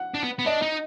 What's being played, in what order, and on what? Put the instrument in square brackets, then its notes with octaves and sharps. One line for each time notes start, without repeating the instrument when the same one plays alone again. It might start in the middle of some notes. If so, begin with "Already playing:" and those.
Already playing: [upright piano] F#5
[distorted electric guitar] D4
B3
B3
[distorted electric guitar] D4 [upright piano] D#5
[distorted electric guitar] D#4